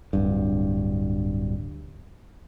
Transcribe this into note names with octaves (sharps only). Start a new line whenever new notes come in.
D1 G2